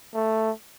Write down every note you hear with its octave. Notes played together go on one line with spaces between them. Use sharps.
A3